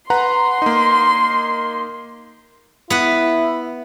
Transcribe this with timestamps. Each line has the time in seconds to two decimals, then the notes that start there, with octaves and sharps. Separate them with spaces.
0.10 B4 F#5 A#5 C6
0.62 A#3 D#4
2.90 B3 E4 B4